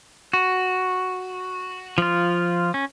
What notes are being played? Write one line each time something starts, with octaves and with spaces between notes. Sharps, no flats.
F#4
F3 F4
C#4